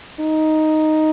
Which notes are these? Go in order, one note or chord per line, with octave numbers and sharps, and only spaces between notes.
D#4